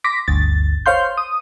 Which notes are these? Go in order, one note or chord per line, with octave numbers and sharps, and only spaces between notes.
C6 D6 A#6 B6
G1 D2 A6
C5 C#5 F5 C6 G6
D#6